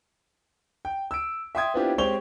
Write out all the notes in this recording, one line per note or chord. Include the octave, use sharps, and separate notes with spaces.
G5
E6 D7
E5 G5 C6 D#6 G#6
B3 C4 D4 E4 F4 G4
G#3 C4 G4 C#5 F7 G7